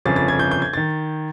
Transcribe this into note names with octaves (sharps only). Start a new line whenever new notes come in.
G1 F2 C#3 A6
A6
G#6
G6
G6
G#6
D#3 A6